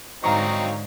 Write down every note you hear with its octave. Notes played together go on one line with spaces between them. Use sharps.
G#2 D3 F#3 C4 D#4 F5 A#5 C#6